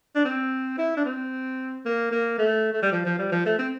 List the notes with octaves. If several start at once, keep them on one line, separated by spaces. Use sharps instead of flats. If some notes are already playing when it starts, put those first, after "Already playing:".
D4
C4
E4
D4
C4
A#3
A#3
A3
A3
G3
F3
F3
G3
F3
A3
C4